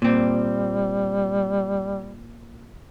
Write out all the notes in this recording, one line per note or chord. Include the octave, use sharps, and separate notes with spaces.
A#2 G3 C4